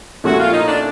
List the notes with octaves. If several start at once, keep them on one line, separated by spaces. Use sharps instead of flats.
A#2 F3 A3 C#4 E4 F#4
F4
D#4
D4